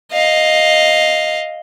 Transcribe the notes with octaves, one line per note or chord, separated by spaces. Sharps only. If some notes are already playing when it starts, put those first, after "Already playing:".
D#5 F5